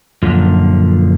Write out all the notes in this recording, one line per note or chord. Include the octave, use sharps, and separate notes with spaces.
F#2 A#2 D3 F3